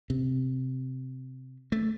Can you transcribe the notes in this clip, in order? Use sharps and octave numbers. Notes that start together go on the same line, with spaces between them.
C3
A3